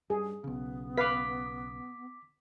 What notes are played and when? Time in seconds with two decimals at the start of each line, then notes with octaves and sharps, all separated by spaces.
0.10 G2 G#4
0.44 B1 C#3 B3
0.98 B4 F5 D6 B6